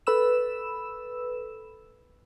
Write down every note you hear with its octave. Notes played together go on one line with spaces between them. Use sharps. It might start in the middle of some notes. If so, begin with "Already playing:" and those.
A4 B4 B5 E6 E7